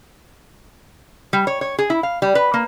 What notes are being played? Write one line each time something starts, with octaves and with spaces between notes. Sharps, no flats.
G3
C#5
C#5
G#4
E4
F5
G3
B4
A#3